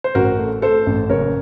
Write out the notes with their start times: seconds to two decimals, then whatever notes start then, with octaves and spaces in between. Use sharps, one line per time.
0.04 C5
0.15 A1 F#4 A#4
0.38 A3
0.62 A3 A4 C5
0.86 A1
1.10 F#1 A#4 C#5